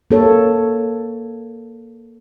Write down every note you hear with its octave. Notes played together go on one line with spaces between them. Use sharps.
A#3 A4 C#5